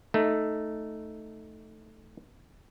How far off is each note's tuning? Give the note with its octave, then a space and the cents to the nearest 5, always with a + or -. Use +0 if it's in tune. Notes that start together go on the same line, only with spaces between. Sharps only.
A3 +0 D#4 +0